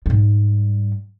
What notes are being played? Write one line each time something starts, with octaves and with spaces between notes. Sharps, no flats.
G#2 G3